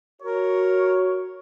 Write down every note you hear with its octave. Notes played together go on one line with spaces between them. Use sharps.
F#4 A#4 C#5